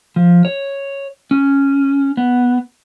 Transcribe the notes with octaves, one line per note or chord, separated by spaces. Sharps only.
F3
C#5
C#4
B3